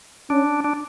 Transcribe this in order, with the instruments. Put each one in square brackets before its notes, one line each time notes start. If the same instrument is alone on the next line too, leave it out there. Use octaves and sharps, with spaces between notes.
[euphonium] C#4 [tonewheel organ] D4
[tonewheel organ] D4